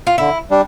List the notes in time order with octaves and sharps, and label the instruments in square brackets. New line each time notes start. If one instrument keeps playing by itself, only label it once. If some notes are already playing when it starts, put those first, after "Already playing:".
[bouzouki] F4
[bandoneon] D3 [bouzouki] E4
[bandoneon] G3 D4